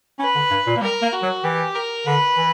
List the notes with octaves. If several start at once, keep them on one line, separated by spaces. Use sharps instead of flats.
C#4 B4
D3
G2
A#2
A#3
G3 A#4
A#3
F#4
F#3
E3 G4
A#4
D3 B4
E3